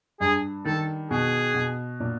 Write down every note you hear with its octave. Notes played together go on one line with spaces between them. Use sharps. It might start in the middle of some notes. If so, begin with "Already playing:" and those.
G2 G#4
D#3 A4
B2 G#4
B2
A#2